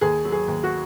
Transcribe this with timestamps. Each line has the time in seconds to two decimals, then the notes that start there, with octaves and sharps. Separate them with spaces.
0.01 D#2 G#4
0.25 F#3
0.32 G#4
0.48 D#2
0.64 F#4